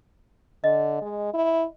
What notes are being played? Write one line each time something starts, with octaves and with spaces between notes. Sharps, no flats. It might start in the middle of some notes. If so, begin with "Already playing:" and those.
D3 D#5
G#3
E4